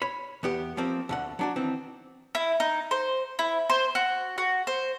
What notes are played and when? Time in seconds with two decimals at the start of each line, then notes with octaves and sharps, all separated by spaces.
0.02 C#5 B5
0.43 E2 B3 G4
0.77 F3 A#3 C4
1.09 D2 D3 F#5
1.39 F#3 D4 F#4
1.56 D#3 E3 C4
2.35 E4
2.60 D#4
2.91 C5
3.39 E4
3.70 C5
3.95 F#4
4.38 F#4
4.67 C5